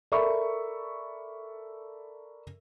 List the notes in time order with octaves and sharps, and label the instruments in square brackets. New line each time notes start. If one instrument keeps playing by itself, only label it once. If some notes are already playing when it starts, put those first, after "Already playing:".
[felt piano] A4 A#4 D5 E5 B5 C#6